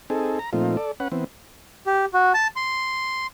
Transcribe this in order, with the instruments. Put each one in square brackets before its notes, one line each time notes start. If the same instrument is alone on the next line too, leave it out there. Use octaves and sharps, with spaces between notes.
[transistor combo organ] C4 D#4 G#4 A4
A#5
A#2 F3 A3 C4 D#4 F4
A4 D5
C#4 B4 F#5
E3 B3 C4
[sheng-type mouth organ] G4
F#4
A5
C6